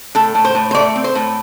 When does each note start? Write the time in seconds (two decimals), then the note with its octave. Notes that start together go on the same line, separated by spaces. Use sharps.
0.15 A2 A4
0.35 A2
0.45 C5
0.55 A2
0.71 C5
0.75 A3 D5
0.96 C4
1.04 C5
1.15 A2